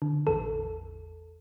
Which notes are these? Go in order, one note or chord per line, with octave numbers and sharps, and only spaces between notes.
D3
A1 E2 A4